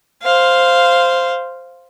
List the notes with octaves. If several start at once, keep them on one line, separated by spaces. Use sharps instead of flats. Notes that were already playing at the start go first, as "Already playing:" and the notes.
C5 F5